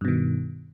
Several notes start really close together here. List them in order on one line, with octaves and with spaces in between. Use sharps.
G2 B2 D#3